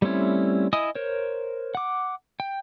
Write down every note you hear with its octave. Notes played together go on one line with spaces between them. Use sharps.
G3 A3 C4 C#4 E4
E4 D#5 G#5 D#6
A#4 C5 C#5
F#5 D6
G5